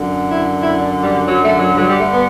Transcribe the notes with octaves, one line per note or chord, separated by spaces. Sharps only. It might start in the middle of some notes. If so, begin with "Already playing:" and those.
Already playing: F#2 D3
E4
E4
D4
G3
F#3
A3
F#3
G2 D3 F#3
G3
A3
B3